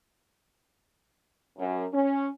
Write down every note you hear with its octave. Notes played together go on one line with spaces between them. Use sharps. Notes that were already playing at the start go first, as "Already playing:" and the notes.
F#2
C#4